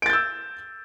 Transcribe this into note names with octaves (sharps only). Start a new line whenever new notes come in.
E6 G6 A6 D7